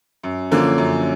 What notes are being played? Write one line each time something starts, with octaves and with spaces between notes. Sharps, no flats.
F#2
D3 F3 A#3 C#4
F#2